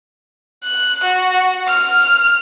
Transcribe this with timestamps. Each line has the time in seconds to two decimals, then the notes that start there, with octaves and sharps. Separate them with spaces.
0.64 F#6
1.03 F#4
1.68 F6